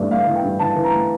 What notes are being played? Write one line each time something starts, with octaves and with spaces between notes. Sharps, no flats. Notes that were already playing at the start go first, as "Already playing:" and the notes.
Already playing: G2 E3 A3 D5
A3 F5
E3
G5
G2
E3 A5
E3
A#5
A3